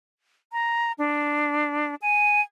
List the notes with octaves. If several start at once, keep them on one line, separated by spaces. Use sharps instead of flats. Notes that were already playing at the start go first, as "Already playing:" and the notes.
A#5
D4
G#5